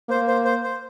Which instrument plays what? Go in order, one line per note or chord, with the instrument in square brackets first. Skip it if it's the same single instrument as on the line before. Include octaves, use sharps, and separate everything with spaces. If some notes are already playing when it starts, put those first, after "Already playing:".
[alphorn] A#3 [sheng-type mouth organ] C5
[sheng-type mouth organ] C5
C5
C5